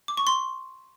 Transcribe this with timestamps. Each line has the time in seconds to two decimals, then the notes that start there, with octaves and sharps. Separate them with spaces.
0.08 D6
0.17 C#6
0.27 C6